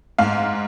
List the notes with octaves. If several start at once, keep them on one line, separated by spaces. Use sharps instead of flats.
G#2 F5